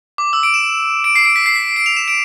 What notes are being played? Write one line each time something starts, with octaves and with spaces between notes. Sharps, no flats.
D6
E6
D7
E7
D7
C7
D7
B6
C7
B6
D7
F7
E7
D7